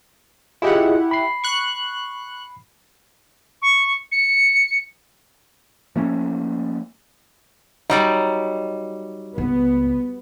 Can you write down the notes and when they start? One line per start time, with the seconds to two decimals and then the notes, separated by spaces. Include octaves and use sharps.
0.62 E4 F4 G4 G#4 D#5 F#5
1.11 B5 C7
1.44 C#6 F#6
3.62 C#6
4.12 C#7
5.96 F3 A3 A#3 C#4
7.90 F#3 G3 D#4 D5
9.38 C#2 B3